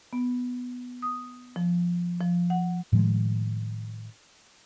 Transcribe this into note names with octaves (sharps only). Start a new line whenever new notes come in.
B3
D#6
F3
F3
F#5
A2 D#3 F3 G#3